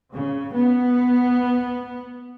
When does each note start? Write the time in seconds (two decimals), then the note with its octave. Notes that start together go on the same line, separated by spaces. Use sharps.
0.12 C#3
0.53 B3